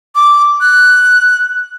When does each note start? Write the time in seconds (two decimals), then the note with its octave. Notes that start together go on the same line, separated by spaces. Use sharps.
0.16 D6
0.61 F#6